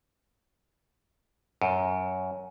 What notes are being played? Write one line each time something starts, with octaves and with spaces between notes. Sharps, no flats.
F#2